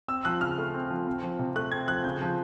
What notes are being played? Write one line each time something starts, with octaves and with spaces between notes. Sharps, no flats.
C4 E6
F3 F#6
C#3 F6
A3
C4
F3
C4
F3
C3
A3 F#6
C4 G#6
F3 F#6
C#3 G6
F3